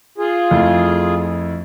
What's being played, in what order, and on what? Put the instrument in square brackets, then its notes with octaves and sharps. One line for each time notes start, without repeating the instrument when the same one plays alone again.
[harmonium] F4 G#4
[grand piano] F2 A3 E4